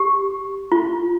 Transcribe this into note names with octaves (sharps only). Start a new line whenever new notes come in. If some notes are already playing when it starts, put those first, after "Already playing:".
Already playing: G4
F4